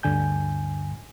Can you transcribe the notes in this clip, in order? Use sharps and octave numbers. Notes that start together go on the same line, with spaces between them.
D2 G2 D3 G#5 G6